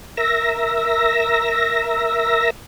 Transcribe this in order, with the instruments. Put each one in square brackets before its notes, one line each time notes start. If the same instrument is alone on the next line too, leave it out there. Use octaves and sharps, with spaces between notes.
[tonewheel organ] A#4 E5 E6 A#6